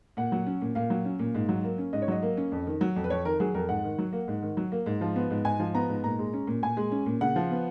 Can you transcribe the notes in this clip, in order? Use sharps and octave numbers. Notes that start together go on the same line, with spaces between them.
A#2 F#5
F#3
C#4
A#2
A#2 F5
F#3
C#4
A#2
G#2
F#3
A#3
C#4
G#2 D#5
C#5
F#3 D#5
A#3
C#4
F2
D#3
F#3
F2
B4
F2 C#5
D#3 A#4
F#3 G#4
F2 A#4
G#2 F#5
D#3
F#3
A#3
G#2
D#3
F#3
A#3
G#2
F3
B3
G#2
G#2 G#5
F3
B3 A#5
G#2
A#2 A#5
G#3
C#4
A#2
A#2 G#5
G#3
C#4
A#2
C#3 F#5
F3
B3